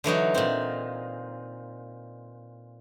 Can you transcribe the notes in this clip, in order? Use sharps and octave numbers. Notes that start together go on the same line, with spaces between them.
D3 E3 F#3 D#4
A#2 C4